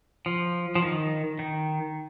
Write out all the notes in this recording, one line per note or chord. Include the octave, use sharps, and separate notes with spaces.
F3
F3
D#3
D#3